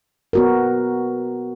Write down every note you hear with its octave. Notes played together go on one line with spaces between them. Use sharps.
B3 F#4 A#4